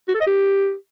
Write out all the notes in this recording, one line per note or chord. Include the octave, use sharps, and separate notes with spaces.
F#4
A4
D#5
G4